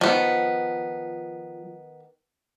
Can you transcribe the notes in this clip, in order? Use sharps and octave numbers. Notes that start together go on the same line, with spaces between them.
D#3 F3 B3